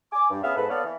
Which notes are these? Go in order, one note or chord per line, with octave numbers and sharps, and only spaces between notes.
G#5 D6
G2
B3 C#4 G#4 E5 F5
G#2 A4 B4
B3 A4 C#5 D5 F5
E3